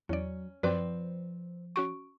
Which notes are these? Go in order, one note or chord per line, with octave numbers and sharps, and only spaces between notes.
E2 F#3 C#4 D5
F#2 F3 C4 B4 D5 F5 G5 D6
C#4 F#4 C#6 D7